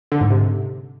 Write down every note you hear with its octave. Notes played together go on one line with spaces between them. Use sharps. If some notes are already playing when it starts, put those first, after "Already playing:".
D3
G#2
C3